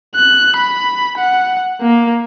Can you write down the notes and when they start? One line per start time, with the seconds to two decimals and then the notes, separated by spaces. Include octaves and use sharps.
0.15 F#6
0.57 B5
1.18 F#5
1.82 A#3